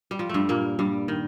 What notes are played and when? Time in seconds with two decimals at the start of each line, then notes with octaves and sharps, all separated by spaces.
0.11 G3
0.19 F3
0.29 G2 G3 A3
0.49 A#2 A#3
0.79 G2 G3
1.08 D#3